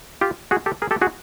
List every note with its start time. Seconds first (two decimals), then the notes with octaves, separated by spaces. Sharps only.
0.21 F4 G4
0.51 F#4 G#4
0.66 G4 A4
0.82 G#4 A#4
0.91 G4 A4
1.01 F#4 G#4